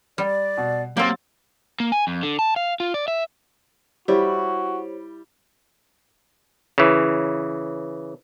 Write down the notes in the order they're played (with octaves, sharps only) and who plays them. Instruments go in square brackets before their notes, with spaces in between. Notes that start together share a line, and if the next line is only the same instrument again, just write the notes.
[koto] G3 [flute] D5
[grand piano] B2
[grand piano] F#3 A6 [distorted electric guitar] A#3 [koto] C4 G4 [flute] F5
[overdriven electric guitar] A#3
G#5
F2
D3
A5
F5
F4
D5
E5
[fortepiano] G3 [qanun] E4 [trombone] F#4 [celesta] G4 C5 C#5
[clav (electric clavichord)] C#3 E3